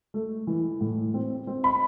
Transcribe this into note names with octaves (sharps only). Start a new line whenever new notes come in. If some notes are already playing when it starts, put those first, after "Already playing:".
A3
E3
A2
C4
C4
B5